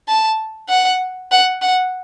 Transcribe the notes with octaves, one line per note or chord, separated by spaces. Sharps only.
A5
F#5
F#5
F#5